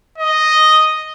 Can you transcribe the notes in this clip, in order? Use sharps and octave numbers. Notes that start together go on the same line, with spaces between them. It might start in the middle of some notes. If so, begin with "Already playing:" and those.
D#5